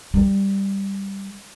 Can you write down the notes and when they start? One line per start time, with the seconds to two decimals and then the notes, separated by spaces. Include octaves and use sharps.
0.14 G3